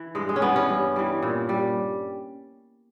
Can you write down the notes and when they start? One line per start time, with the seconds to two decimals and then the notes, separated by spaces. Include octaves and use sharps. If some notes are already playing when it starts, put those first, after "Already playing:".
Already playing: E3
0.15 G2 G#3
0.29 G#3
0.36 C#4
0.42 E3 G3 B3
0.56 C#4
0.69 G2
0.96 E3 G3
1.23 A#2
1.49 G3